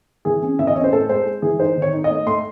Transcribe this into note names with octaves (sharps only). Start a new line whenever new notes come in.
E3 G#4
C#4
E3 E5
D#5
C#4 C#5
C5
A2 A4
G#3 C5
G#3
E3 G#4
D#4 C5
D#3
C#5
D#4
D#5
A3
A3 C6